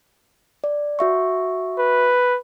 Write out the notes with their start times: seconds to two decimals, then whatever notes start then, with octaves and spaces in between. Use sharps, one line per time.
0.64 D5
0.99 F#4 E5 C#6
1.78 B4